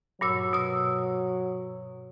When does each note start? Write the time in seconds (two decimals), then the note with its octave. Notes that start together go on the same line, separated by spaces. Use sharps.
0.21 G2 A#2 F#3 E6
0.53 B2 E6